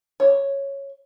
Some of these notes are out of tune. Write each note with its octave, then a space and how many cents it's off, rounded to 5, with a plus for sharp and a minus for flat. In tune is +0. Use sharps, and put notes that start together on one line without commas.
C#5 -5